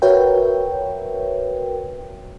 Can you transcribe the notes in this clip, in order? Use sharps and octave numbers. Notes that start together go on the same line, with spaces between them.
F#4 A#4 B4 C#5 E5 G5